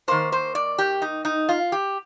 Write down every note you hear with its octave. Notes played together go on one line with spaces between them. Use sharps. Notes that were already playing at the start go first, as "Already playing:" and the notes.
D#3 A#3 C5
C5
D5
G4
D#4
D#4
F4
G4